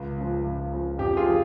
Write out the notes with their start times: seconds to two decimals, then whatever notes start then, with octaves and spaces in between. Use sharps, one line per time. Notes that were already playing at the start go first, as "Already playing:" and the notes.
Already playing: C#2
0.17 C#3 F3
0.44 C#2
0.72 C#3 F3
0.98 F2 G4
1.17 F4 G#4
1.26 C#3 F3